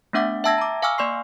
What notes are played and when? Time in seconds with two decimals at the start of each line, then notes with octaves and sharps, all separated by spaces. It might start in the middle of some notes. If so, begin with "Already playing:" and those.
0.13 A3 B3 D4 E5 F#5 D6
0.44 E5 G5 A5 E6 G#6 A#6
0.58 A#5 D6
0.82 F5 G#5 C#6 D6 E6 F6
0.98 A#3 D5 C6 C#6 C7